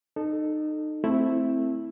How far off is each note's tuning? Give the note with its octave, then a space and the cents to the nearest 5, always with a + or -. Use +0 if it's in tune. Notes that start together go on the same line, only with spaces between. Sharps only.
D#4 -25 A4 +0
A3 +0 C4 +0 E4 +0